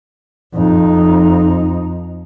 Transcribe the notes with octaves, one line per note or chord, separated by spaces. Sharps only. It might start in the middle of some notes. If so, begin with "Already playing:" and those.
F2 D#4